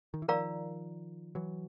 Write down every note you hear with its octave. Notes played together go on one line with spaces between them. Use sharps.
D#3
E3
D#3 F3 A#4 D5 F5 A#5
E3 F#3